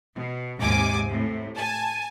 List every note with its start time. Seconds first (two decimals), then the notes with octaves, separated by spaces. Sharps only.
0.15 B2
0.59 D#2 G#2 C3 G#5 D6
1.07 A2 C3
1.56 G#5 A5